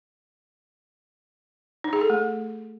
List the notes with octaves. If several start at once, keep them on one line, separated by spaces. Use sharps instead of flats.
D#4
G#4
A4
A3